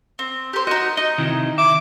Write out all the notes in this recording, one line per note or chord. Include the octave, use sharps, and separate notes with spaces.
C4
G4 C5
D#4 F#4 D#5
D#4 D#5
C3 D#3 E4
E5 D6